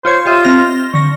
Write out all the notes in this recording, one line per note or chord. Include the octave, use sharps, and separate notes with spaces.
F4 C5 C#5 G#6
F4 G4 D#5 E5
C4 F6 A#6
D3 C#6 A#6